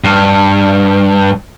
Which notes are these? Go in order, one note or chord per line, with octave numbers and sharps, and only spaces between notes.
G2